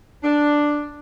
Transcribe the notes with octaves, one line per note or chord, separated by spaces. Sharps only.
D4